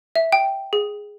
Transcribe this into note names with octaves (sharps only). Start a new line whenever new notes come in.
E5
G5
G#4